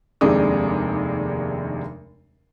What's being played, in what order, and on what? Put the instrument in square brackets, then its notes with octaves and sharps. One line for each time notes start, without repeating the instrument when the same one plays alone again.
[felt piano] F1 D#2 C3 G#3 D4 D#6